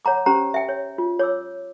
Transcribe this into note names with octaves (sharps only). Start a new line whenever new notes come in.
C#5 F#5 A#5 D6
C#4 G4 C5 A#5
E5 G5
C#5
F4
C#5 D6 E6